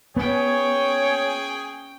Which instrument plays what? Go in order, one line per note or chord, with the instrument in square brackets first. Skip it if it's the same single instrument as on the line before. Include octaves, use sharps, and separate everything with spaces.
[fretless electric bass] B3 [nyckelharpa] C#4 G5 [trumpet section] G#4 [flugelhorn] C#5